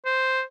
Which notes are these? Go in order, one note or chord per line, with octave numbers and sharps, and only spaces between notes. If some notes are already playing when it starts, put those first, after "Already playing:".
C5